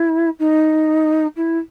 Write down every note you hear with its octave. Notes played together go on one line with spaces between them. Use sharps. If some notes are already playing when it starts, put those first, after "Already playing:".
Already playing: E4
D#4
E4